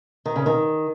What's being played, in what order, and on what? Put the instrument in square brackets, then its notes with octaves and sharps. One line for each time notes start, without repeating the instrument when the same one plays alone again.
[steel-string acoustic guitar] D#3
C#3
D#3